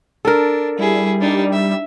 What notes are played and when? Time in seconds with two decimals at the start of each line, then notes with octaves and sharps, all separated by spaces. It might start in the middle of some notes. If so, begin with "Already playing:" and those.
0.25 D4 A4 A#4
0.79 G3 E4 G#4
1.21 D4 D#4
1.52 E5